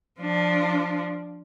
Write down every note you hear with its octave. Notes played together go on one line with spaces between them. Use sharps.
F3 D4